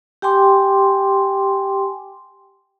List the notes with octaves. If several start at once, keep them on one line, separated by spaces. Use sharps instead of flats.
G4 G5 G#5 C6 D6